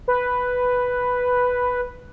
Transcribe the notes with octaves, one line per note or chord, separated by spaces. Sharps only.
B4